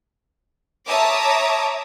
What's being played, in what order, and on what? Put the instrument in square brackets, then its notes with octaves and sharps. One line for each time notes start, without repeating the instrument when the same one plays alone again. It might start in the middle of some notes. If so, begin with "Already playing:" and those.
[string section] C#5 E5 A5 A#5 D6 D#6